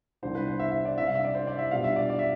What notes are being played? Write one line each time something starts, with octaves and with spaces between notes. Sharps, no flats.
C2 C3 G3 B3 D4 C5
B4
C5
E5
E5
D5
C3 G3 D4 E5
F5
E5
D5
C5
D5
E5
B2 G3 B3 D4 F4 F5
E5
D5
D5
E5